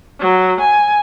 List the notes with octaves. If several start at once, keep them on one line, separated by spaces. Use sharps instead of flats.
F#3
G#5